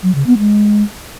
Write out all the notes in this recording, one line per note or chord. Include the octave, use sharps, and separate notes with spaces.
F#3
C#3
B3
G#3